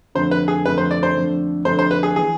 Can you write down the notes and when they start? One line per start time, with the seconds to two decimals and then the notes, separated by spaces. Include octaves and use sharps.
0.15 F2 D3 A3 C5
0.31 B4
0.48 G#4
0.65 F2 D3 A3 B4
0.78 C5
0.91 D5
1.03 C5
1.15 F2 D3 A3 D4 A4
1.65 F2 D3 A3 D4 A4 C5
1.79 C5
1.91 B4
2.03 G#4
2.16 E3 B3 G#4